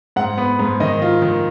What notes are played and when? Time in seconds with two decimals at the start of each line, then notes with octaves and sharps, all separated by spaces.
0.16 G#2 F#5
0.38 B3
0.59 G#2
0.80 D#3 D#5
1.02 F4
1.22 D#3